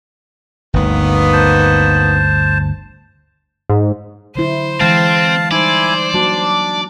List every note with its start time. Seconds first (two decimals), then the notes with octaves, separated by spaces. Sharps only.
0.74 G1 D2 D#3 A#3 B3
1.33 C5 A5
3.70 G#2
4.35 D3 F#3 E4 C5
4.80 E3 G#3 C4 F5 A5
5.51 G3 D#4 E4 C5 D5 G#5
6.14 F#3 A#3 D4 F#4